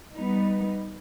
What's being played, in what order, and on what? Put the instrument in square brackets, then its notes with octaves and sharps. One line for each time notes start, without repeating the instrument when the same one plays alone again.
[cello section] G3 B3 D#4